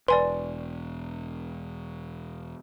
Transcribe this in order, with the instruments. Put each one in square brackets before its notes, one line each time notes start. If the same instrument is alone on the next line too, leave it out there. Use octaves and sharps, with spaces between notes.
[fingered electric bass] E1 [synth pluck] B4 [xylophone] D5 G#5 C6